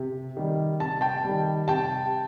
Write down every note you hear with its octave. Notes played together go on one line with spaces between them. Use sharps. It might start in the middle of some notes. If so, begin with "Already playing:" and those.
Already playing: C3
D#3 G3
C3 A5
G5 A5
G3
D#3
C3 G5 A5